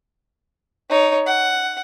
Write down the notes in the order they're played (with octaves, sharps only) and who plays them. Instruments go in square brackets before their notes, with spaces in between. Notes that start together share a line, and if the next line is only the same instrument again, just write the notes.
[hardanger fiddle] D#4 C#5
F#5